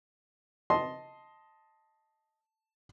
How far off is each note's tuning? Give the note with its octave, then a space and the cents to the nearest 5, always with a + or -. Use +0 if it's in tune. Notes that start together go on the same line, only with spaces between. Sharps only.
D#5 +10 A5 +0 C6 +0